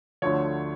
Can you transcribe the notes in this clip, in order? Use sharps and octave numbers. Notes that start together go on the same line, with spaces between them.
D2 D3 F3 C#5